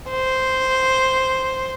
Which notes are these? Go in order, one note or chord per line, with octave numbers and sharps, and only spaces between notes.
C5